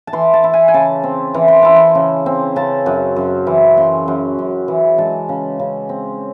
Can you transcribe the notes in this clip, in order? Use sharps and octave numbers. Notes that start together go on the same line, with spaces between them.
A5
E3 C6
A5
E4
G#5
G#5
C#3 A5
C4
E3
C6
E4 A5
C6
C#3
C4
C#3 A5
F#2
F#2
E3
C#3 C6
F#2
F#2
E3
G#3 A5
C#3
C#3
C4